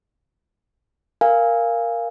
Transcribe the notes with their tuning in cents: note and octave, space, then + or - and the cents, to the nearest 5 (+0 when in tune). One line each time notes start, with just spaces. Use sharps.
A#4 +0 F5 -10 G#5 -15